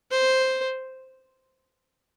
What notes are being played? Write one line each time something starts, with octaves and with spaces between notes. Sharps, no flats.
C5